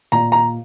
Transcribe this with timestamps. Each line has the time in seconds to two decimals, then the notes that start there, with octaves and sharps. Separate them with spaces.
0.12 A#2 A#5
0.32 A#5